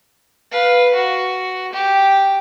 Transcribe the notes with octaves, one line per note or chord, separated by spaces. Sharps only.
B4 F5
F#4
G4